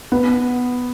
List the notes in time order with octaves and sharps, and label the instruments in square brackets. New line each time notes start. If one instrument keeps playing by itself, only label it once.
[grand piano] B3